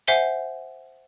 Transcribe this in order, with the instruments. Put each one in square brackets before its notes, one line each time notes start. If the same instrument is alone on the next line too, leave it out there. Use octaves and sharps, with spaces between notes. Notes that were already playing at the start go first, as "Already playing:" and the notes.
[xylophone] C5 E5 F#5 G#5 C7 G7